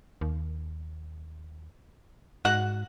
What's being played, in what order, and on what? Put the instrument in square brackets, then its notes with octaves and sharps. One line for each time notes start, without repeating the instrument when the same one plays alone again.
[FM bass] D#2
[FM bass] G#2 [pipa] F#4 F#5